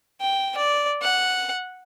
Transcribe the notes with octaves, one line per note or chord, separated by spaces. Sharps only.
G5
D5
F#5